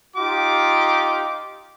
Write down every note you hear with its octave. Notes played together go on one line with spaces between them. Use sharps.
D#4 F4 G4 D6